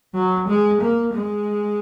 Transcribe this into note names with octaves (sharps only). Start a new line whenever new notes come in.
F#3
G#3
A#3
G#3